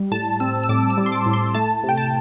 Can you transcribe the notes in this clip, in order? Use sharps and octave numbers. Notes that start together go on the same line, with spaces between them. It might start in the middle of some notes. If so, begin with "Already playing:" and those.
Already playing: G3
A2 A5
C4 E6
E6
A2 D6
E6
G3
C6
D6
A2
C6
A3 A5
C3
G5
A5